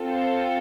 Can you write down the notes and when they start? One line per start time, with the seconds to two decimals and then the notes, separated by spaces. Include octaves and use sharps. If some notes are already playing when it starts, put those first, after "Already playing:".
Already playing: C4 F4 A4
0.09 C5